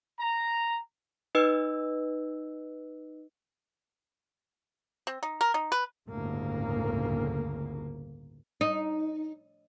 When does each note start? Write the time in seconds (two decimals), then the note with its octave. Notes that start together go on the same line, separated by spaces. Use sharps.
0.19 A#5
1.35 D#4 B4 D#5 E6
5.07 C4
5.23 D#4
5.41 A#4
5.54 D#4
5.72 B4
6.07 G1 D2 A2 C#3 A#3
8.61 D#4